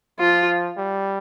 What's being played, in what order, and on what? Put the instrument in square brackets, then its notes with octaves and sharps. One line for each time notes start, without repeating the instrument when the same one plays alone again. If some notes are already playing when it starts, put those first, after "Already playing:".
[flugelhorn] F3 [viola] F4
[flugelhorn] G3